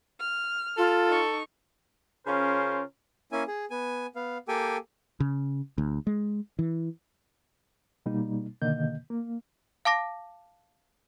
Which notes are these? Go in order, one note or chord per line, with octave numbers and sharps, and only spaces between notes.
F6
F4 A4
D#4 C#6
C#3 C#4 F4 A#4 C5
A#3 C#4 E4 G#5
G#4
B3 G#5
B3 F5
A#3 G4 A4 G5 G#5
C#3
D2
G#3
E3
B2 G3 A#3 D#4
B2 D3 D#3 A#3 D#5 G6
A#3
F5 A5 D6 A#6